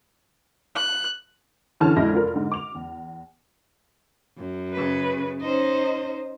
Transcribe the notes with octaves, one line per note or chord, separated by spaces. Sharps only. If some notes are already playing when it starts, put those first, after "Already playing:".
F#6
D3 E3 C#4 A5 F6
A#1 F2 G#3 E4 A#6
F1 F4 A#4
G#2 D3
D6 F7
E2
F#2
C#3 B4
C#4 D#4 C5 D#5